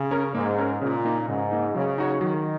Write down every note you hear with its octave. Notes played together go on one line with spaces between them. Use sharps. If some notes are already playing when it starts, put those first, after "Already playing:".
Already playing: C#3
C#4 A#4
G#2 A#3
C#4 A#4
A#2 C#3
A#3 D#4
G#2 C#3
A#3 D#4
C#3 F#3
D#4 F#4 C#5
D#3 F#3